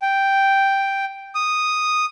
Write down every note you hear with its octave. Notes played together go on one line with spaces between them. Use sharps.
G5
D#6